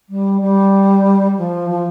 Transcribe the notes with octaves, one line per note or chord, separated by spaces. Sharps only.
G3
G3
F3
F3